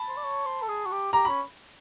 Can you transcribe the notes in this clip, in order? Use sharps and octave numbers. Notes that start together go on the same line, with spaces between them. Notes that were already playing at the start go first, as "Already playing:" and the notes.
Already playing: A5 B5
C5
D5
C#5
C5
A4
G#4
F#4
G4
G4 A#5
C#4 B5